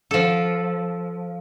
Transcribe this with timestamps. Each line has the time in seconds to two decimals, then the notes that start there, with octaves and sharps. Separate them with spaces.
0.11 F3 A4